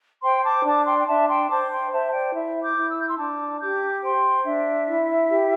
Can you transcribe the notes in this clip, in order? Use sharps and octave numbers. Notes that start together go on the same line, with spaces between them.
C5 G5 C6
A5 D6
D4 A5 D6
G5 C6
G5
D4 E5 A5
G5 C6
C5 A5 D6
G5 C6
C5 E5 A5
D5 G5
E4 E5
D6 G6
E4
E6
G6
C6 E6
D4 A5 D6
G4 D6 G6
C5 G5 C6
D4 E5
E4
G4